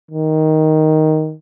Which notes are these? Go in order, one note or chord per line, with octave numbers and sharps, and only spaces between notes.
D#3